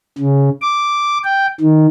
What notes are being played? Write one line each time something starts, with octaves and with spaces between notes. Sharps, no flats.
C#3
D6
G5
D#3